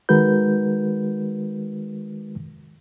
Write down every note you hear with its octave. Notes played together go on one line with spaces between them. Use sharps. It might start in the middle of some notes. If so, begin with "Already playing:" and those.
D#3 G#3 F#4 A#4 B4 G6